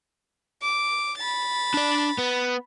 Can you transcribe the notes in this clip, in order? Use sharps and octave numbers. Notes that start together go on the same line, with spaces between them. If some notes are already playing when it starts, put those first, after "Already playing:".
D6
B5 A6
D4 D5
B3